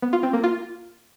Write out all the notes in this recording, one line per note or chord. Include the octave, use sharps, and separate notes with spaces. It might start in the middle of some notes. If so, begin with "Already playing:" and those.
B3
F4
C4
A#3
F4